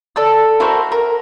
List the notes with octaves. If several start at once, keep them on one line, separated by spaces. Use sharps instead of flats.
A4 D5 E6
E4 F#4 A#4 C5
A#4